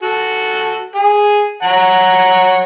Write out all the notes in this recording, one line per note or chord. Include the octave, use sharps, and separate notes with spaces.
F#4 A4
G#4
C#5 F#5 A#5